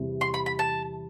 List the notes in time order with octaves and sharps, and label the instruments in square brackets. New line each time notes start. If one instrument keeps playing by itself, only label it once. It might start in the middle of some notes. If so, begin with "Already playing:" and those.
Already playing: [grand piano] E2 C3 E3 G3
[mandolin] C6
B5
B5
A5